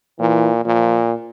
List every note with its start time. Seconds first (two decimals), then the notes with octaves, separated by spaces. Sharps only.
0.19 A#2 E3
0.65 A#2 F3